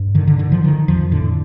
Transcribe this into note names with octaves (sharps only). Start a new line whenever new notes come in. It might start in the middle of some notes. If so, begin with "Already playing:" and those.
Already playing: G2
D3 D#3
D3
D3 D#3
F3
D3 D#3
F2 F3
A2 D3